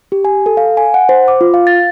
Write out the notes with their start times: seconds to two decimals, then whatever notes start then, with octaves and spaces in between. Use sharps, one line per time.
0.12 G4
0.25 G#5
0.46 A4
0.57 F5
0.77 G#5
0.94 F#5
1.09 C5
1.28 D6
1.41 F4
1.54 F5
1.67 A6